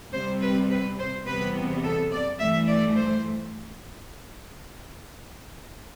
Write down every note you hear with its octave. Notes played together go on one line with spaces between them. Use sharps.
C3 G3 C4 C5
B4
B4
C5
E2 C3 G3 B3 B4
A4
D5
G2 E3 A3 E5
D5
C5